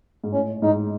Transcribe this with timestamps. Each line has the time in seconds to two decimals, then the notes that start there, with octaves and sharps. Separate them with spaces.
0.24 G#2
0.33 A2 C#4
0.62 G#2 D#4